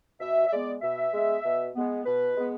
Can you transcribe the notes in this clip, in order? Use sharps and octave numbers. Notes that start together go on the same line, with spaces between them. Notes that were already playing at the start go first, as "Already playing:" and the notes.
B2 E5
E5
G#3 B3 D5
B2 E5
G#3 B3
B2
G#3 B3
B2 B4
G#3 B3